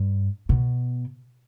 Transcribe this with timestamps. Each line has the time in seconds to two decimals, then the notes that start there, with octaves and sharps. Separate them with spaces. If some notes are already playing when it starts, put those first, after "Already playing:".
Already playing: G2
0.49 B2